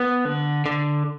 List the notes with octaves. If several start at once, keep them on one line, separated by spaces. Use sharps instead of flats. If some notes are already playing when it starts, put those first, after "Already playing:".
Already playing: B3
D3
D3